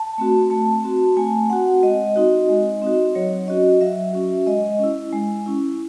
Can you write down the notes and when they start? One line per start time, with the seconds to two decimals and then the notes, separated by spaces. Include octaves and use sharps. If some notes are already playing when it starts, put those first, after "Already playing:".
Already playing: A5
0.18 A3 C4 F#4
0.50 A3 A5
0.84 C4 F#4
1.17 A3 G#5
1.50 C4 F#4 F#5
1.83 G#3 D#5
2.16 C4 D#4 F#4
2.49 G#3
2.82 C4 D#4 F#4
3.15 F#3 C#5
3.48 C#4 F#4 D#5
3.81 F#3 E5
4.13 C#4 F#4
4.47 G#3 D#5
4.79 C#4 E4
5.13 G#3
5.46 C#4 E4